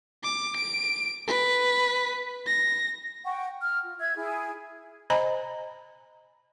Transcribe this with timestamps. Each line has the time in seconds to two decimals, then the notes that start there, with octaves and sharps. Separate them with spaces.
0.24 D6
0.56 D7
1.27 B4
2.47 A#6
3.25 F#5 G5 C#6
3.61 F6
3.83 F4
3.99 E5 E6 G#6
4.15 E4 G#4
5.10 C5 D#5 G#5 A#5 B5